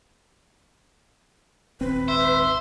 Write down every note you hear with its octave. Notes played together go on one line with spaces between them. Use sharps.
D#1 G#1 C4 B4
C5 E5